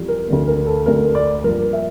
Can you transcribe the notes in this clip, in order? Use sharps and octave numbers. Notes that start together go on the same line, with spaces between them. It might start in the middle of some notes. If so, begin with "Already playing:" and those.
Already playing: F2 E3 G3
A#4
D2 D3 A3
A#4
A4
D2 D3 A3 A#4
D5
G2 F3 A#3 A#4
E5